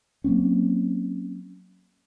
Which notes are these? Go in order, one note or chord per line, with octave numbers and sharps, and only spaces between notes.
F#3 A#3 C4 C#4